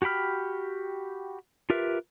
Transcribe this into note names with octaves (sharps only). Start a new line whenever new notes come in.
F#4 G4 G5 B5 F6
F4 G4 A#4 B4 E5